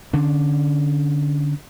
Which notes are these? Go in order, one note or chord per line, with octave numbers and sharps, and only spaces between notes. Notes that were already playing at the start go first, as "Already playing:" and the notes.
D3 C#4 D4